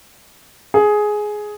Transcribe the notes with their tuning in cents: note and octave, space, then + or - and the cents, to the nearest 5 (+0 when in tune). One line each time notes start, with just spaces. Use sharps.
G#4 +10